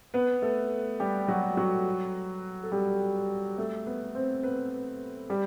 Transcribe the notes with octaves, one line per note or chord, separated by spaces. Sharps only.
B3 B4
A3 A4
G3 G4
F#3 F#4
F#3 F#4
A4
G3 G4
A3 A4
B3 B4
C4 C5
B3 B4
G3 G4